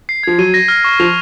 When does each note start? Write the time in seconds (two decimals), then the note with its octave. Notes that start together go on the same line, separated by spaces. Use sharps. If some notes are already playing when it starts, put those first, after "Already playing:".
0.09 C7
0.23 F3 G#6
0.38 F#3 D#7
0.54 A#6
0.68 F6
0.84 C#6
1.00 F3 F7